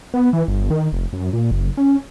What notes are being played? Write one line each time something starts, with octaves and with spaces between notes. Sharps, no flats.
B3
E3
G1
D#3
F1
F#2
A#2
F#1
C#4